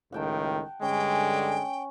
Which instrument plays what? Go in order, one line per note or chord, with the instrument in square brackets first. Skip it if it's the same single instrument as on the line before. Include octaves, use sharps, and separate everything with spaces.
[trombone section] C#2 A2 D#3 [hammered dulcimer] F#5 G5 A5
[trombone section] G2 D3 [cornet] G#3 [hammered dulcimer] C#4 [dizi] G5